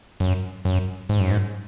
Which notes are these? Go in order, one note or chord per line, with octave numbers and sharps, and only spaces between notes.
F#2
F#2
G#2
F#2
G#2